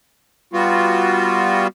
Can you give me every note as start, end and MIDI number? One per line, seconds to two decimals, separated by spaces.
0.53 1.67 55
0.53 1.67 59
0.53 1.67 65
0.53 1.67 66